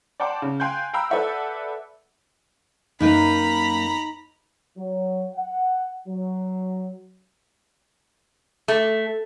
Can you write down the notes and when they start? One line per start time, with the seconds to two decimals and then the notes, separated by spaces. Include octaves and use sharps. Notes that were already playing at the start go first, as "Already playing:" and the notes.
0.20 D5 F#5 G5 A5 C6 D6
0.42 C#3
0.60 F5 G5 G#5 C6 F#6 G6
0.93 F5 G5 A#5 B5 E6
1.10 A4 B4 D5 E5 F#5
3.00 F#2 A#3 D#4 B4 A#5 B5
4.78 F#3
5.36 F#5
6.08 F#3
8.68 A3